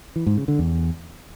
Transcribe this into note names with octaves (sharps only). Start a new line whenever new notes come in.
E3
G#2
C#3
D3
E2